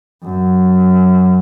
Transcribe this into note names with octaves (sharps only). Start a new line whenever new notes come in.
F#2